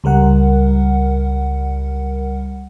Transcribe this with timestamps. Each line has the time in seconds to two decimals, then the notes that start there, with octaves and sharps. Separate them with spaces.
0.04 C#2 G3 A#4 F#5